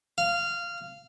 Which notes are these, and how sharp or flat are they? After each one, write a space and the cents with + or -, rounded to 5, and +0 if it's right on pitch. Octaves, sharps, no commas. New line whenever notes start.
F5 -15